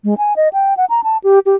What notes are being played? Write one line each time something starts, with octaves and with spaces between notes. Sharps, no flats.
G#3
G#5
D#5
G5
F#5
A#5
A5
G4
G4